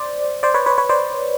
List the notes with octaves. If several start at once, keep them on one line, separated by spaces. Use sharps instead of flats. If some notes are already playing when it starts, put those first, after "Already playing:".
Already playing: C5 D5
C5 D5
B4 C#5
B4 C#5
B4 C#5
C5 D5